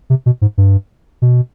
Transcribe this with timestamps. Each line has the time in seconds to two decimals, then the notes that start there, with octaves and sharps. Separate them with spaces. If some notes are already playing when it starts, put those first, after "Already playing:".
0.10 C3
0.26 B2
0.42 G#2
0.58 G2
1.22 B2